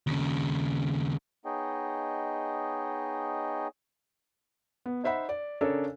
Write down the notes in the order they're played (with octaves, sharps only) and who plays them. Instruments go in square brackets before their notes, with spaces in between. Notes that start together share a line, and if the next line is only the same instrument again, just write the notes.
[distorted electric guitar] D#2 C#3
[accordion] B3 D#4 G#4 C#5 D#5 G5
[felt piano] B3
D#4 C5 E5 F#5 B5
D5
C#3 D4 A4 A#4 C#5